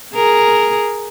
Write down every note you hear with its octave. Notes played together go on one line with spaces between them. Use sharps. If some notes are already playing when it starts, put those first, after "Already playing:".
G#4 A#4